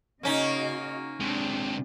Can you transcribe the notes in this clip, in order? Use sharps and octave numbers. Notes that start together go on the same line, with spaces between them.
C#3 A#3 C#4 D#4 F#4 D#5
C3 G#3 D4